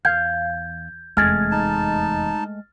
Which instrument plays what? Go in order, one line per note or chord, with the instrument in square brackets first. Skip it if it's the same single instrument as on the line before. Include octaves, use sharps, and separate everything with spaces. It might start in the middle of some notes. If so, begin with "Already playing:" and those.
[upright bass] E2 [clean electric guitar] F5 [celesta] G6 G#6
[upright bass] F1 E2 [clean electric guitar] G#3 A3 G#4 [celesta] F6 A6
[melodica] D#4 A5